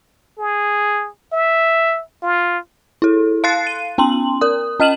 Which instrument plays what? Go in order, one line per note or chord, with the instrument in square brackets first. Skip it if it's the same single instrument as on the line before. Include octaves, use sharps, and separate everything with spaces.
[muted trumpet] G#4
E5
F4
[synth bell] E4 A4
F5 C6 F#6 A6 C7
D#7
B3 C#4 C6 F#7
A#4 D#6
C#4 D#5 F6 D#7 E7 F#7